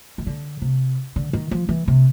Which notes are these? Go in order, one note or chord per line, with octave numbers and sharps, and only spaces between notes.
D#3
D3
C3
D3
D#3
F3
E3
C3